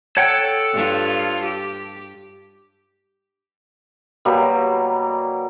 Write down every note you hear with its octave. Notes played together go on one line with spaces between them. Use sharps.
A4 C#5 F#5 G5
G2 F4
G4
B2 F#3 G3 A#3